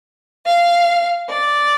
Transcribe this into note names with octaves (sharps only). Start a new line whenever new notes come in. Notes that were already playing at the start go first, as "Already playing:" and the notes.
F5
D5